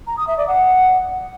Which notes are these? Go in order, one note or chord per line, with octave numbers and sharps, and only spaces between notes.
A#5
D#6
E5
D5
F#5